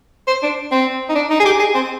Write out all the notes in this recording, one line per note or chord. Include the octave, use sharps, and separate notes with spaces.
C5
D4
C4
D#4
D4
D#4
G#4
G4
G#4
C4